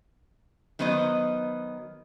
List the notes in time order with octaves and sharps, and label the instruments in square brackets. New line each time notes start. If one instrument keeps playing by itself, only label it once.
[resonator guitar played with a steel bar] D#3 F#3 B3 C5 D#5